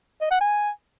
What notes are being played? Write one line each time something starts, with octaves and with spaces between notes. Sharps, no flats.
D#5
F#5
G#5